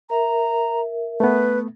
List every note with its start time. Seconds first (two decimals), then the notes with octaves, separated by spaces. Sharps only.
0.10 A#4 E5 A#5
1.20 A3 B3 B4